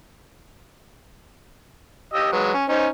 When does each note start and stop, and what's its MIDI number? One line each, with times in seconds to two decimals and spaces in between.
2.14 2.28 67
2.14 2.28 75
2.14 2.28 88
2.33 2.52 54
2.33 2.52 56
2.33 2.52 71
2.54 2.64 61
2.69 2.87 61
2.69 2.87 63
2.69 2.87 72